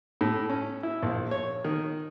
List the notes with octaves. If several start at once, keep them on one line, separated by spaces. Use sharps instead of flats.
A2
C#4
E4
A#1
C#5
D#3